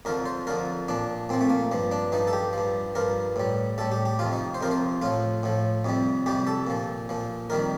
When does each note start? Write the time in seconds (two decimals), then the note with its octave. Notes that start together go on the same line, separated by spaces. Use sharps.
0.05 F2 D3 F3 A#4
0.26 C5
0.47 F2 D3 F3 A#4
0.88 A#2 F3 D4
1.29 A#2 F3 C4
1.41 A3
1.50 A#3
1.72 G2 F3
1.92 D4
2.12 G2 F3 D#4
2.27 A4
2.33 G4
2.53 G2 F3
2.95 G2 F3 A#4
3.36 A2 G3
3.78 A2 G3 A4
3.92 G4
4.06 G4
4.19 F2 C3 F3 F4
4.33 D#4
4.54 C5
4.61 F2 C3 F3 A#4
4.71 C5
5.02 A2 F3 F4
5.43 A2 F3
5.85 F2 C3 G3
6.26 F2 C3 G3 G4
6.47 A4
6.67 A#2 F3
7.09 A#2 F3
7.50 F2 D#3 G3 A#4